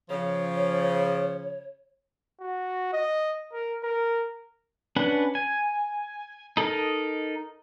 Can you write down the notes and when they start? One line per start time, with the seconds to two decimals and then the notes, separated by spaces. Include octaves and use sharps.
0.10 C#3 F3 C#5
2.40 F#4
2.93 D#5
3.53 A#4
3.83 A#4
4.96 C#4 D4 B4 F#5
5.35 G#5
6.57 D#4 A4 A#4 D#5